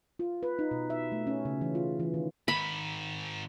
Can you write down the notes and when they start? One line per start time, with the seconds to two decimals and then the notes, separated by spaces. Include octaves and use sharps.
0.19 F4
0.43 B4
0.59 D#4
0.71 B2
0.90 E5
1.12 A3
1.27 C#4
1.45 C#3
1.61 E3
1.75 F4
2.00 E3
2.14 D#3
2.48 G#2 D#3 B5